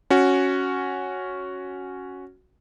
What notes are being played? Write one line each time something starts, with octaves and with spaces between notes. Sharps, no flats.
C#4 F#4